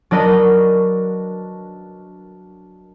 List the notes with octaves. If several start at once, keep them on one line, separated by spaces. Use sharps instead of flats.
F#3 D4 A#4 B4 D#5 A#6